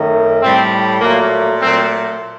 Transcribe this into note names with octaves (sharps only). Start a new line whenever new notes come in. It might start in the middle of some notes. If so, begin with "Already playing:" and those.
Already playing: F#2 D#3 A3
A2 G3 C4
A#2 F#3 A3 A#3
A#2 F#3 A3 C4